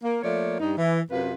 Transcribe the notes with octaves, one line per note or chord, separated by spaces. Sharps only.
A#3
F3 A3 A#3 C#5 D5
G2 D#4
E3
F#2 C3 F4 B4